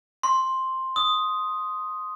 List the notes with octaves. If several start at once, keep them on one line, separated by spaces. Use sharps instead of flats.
C6
D#6